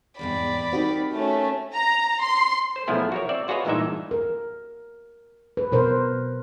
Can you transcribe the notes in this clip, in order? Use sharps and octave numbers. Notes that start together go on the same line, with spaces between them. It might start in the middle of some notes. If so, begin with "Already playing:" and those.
E2 G#2 C3 D5 B5
C4 D#4 F#4 G4 A#4
A3 C#4
A#5
C6
C5
B1 F3 A3 B3 E4 G#4
F#4 A#4 C#5
C4 D5 E5
F4 F#4 G#4 B4 C#5 D#5
G2 A#2 E3 G#3 D#4 E5
A#4
B4
B2 A#4 C5